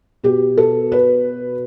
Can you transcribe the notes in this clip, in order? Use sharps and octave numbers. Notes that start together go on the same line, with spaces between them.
B2 G4
A4
B4